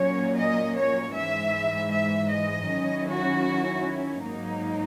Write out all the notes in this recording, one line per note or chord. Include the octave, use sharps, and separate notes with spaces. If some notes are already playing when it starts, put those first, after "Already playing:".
Already playing: A#2 F#3 A#3 C#4 C#5
D#5
C#5
G#2 E3 G#3 E5
E5
D#5
D#3 F#3 C#4 E4
F#4
G#2 F#3 A#3 D#4